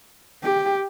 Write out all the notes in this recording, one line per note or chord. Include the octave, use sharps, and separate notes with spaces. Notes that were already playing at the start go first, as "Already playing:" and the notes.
G4